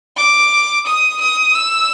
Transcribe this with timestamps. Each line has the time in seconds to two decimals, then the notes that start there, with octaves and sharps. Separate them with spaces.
0.16 D6
0.86 D#6
1.20 D#6
1.55 E6